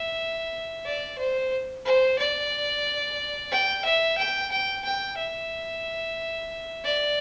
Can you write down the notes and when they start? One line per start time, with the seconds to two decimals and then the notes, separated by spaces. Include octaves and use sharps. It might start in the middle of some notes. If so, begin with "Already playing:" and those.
Already playing: E5
0.86 D5
1.19 C5
1.85 C5
2.19 D5
3.52 G5
3.85 E5
4.18 G5
4.51 G5
4.85 G5
5.18 E5
6.84 D5